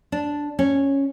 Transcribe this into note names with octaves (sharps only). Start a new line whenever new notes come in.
D4
C#4